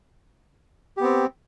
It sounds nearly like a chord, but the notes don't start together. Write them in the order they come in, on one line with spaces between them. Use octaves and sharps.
G4 B3 C4